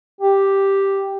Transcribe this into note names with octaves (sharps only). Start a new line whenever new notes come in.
G4